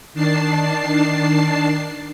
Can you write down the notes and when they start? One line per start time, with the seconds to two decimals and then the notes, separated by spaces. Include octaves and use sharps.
0.14 D#3 D4 A5 C7